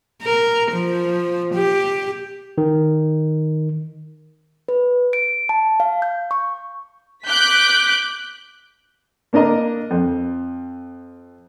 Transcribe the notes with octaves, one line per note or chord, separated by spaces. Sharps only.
A#4
F3
G4
D#3
B4
D7
A5
F5
G6
C#6
D6 F#6 G6 B6
A#3 D4 A#4 D#5 A#5
F2